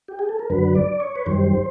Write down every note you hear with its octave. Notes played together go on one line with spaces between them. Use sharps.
G4
G#4
A4
A#4
F#2 D3 F#3 B4
D5
C#5
B4
F#2 D#3 G3 C5